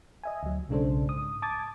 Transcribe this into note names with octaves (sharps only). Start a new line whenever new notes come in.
D#5 E5 G#5
D2 F#3
B1 C#3 G#3 D4 A4 C5
G#2 D#6
A5 D6 D#6 G#6 A6